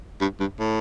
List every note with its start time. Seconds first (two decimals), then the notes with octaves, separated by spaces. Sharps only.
0.21 G2
0.40 G2
0.59 A2